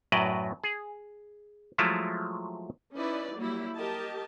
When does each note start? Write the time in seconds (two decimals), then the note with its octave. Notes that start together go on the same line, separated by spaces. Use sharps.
0.12 F#2 A2 F#3 B4 D5 D#5
0.64 G#4
1.78 F3 F#3 G#3 A3 E4 F4
2.95 C#4 D#4 E4 B4 D5
3.35 F#3 G3 A#3 E4
3.75 G4 A#4 D#5 A5